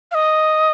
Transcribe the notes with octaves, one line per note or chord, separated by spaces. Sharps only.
F5
D#5